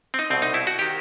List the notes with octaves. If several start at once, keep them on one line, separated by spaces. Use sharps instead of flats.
C4
D#4
C2 B2 C4
D#4
E4
F#4
D#3 G4